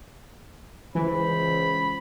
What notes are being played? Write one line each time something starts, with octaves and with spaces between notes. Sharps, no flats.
C#2 E3 C5 B5